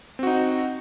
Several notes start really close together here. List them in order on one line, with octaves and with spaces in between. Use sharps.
C4 F#4 D#4